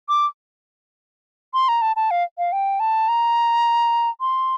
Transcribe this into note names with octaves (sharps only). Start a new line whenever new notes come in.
D6
C6
A#5
A5
A5
F5
F5
G5
A5
A#5
C6